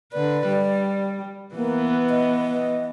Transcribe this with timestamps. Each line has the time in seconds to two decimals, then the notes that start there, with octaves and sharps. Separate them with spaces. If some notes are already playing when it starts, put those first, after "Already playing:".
0.13 D3 B4 D5
0.47 G3
1.55 E3 A#3 B3
2.10 D#5